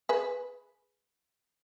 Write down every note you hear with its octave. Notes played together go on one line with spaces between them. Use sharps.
G#4 B4